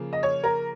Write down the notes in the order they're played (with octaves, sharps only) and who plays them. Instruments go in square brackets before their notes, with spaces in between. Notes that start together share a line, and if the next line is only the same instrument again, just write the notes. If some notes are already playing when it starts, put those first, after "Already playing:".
Already playing: [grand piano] C#3 F3 A#3
[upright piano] D#5
C#5
A#4